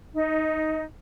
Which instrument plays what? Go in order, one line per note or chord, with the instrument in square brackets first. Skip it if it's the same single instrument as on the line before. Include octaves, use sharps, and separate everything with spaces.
[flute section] D#4